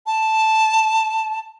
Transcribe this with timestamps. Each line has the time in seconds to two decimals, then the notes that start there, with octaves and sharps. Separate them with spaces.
0.07 A5